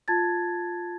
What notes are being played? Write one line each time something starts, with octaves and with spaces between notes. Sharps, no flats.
F4 A5 G#6 A6